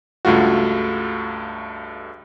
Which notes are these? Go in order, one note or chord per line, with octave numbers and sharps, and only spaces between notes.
C#2 G2 A3 F4 F#4